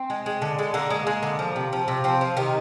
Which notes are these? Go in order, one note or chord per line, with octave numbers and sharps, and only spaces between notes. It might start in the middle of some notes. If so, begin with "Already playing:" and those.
Already playing: C4
G#3
G#3
D3
G#3
D3 A#3
G#3
G#3
D3
F3
C3
F3
C3
F3 C4
F3
C3 D#3 D#4